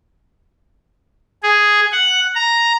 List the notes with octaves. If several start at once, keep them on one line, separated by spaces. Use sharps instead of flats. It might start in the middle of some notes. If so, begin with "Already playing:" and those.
G#4
F#5
A#5